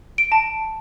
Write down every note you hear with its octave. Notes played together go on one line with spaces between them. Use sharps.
D7
A5